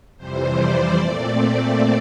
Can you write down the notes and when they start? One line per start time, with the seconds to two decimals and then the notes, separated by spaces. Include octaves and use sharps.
0.17 F2 C3 E3 G3 C5
0.56 D5
0.95 A#2 A3 C4